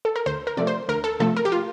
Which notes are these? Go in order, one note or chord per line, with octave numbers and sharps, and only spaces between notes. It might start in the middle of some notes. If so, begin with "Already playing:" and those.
A4
A#4
D2 C5
A#4
C3 F3 A3 D5
C5
D2 A#4
A4
C3 F3 A3 A4
A#4
G4
F4